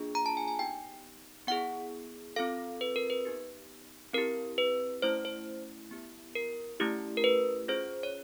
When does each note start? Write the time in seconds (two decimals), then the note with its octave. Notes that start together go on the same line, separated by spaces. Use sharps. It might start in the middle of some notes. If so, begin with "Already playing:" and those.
Already playing: A#3 D4 F4 G#4
0.15 A#5
0.26 A5
0.37 G#5
0.48 G#5
0.59 B3 D#4 G4 G5
1.48 B3 E4 G#4 F#5
2.36 C4 F4 A4 F5
2.81 B4
2.96 A#4
3.10 B4
3.25 B3 D#4 G4
4.14 C4 E4 G4 A#4
4.58 B4
5.02 A3 C#4 E4 C5
5.25 C5
5.91 B3 E4 G4
6.35 A#4
6.80 A3 C#4 E4 G4
7.17 A#4
7.24 B4
7.68 C#4 F4 G#4 C5
8.03 C#5